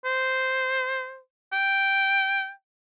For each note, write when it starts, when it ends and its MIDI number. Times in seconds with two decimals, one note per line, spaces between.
0.05 1.18 72
1.53 2.51 79